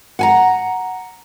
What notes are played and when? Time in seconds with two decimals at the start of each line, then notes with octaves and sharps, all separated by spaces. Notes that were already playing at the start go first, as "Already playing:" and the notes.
0.19 F#5 G#5 A#5